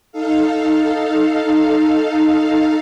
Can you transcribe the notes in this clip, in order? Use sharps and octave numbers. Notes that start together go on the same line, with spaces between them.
D#4 A4 F5